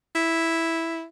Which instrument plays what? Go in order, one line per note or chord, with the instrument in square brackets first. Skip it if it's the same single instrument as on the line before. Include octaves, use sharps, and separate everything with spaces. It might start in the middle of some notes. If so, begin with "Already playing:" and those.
[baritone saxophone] E4